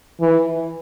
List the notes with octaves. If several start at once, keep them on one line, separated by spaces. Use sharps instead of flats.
E3